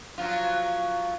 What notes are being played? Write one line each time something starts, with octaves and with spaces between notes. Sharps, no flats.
F3 F#3 F4